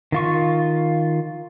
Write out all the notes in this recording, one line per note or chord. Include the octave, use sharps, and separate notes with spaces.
D#3 F4 C#6